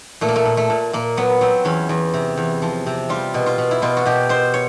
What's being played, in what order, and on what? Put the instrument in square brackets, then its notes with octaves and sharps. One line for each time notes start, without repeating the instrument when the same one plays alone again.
[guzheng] A#2 A3
A#3
A3
A#2
A3
A#2
A#2 A#3
F#3 B3
F#3 C4
E2 C#4
E2
C3
E2
F3
C3
G3 F4
B2
F4
B2
E4
B2 F4
F#4
B2 G4
B2 C5
C#5